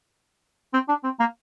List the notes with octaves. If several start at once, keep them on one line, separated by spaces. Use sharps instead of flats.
C4
D4
C4
A#3